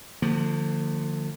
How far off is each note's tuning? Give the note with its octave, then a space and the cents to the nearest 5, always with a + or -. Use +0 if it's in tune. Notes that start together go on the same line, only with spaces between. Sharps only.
D3 +30 F3 +0 A#3 -35